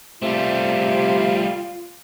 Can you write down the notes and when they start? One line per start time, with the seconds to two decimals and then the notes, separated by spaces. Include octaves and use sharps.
0.22 C3 G3 A3 F4